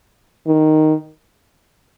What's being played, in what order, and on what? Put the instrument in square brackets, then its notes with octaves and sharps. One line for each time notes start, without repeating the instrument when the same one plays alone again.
[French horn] D#3